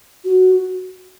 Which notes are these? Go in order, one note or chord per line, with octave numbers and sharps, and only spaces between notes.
F#4